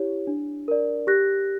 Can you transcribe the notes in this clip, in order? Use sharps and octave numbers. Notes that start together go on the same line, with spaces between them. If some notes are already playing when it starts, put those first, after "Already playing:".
Already playing: E4 G4 C#5
D4
A#4 D5
G4 F#6 A#6